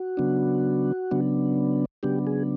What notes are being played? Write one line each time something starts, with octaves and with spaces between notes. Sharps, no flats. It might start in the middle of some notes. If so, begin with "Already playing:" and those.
Already playing: F#4
C#3 F#3 B3 D4
C#3 F#3 B3 D4
C#3 F#3 B3 D4 G4
G#4